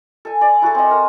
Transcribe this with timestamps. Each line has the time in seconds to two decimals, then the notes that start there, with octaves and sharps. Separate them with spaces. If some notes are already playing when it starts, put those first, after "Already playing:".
0.25 A4 G#5
0.41 D5
0.62 E4 F#4 G#4 A4
0.75 C4 D#5
0.91 A#4